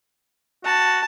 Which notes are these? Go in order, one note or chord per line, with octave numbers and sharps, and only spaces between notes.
F#4 A5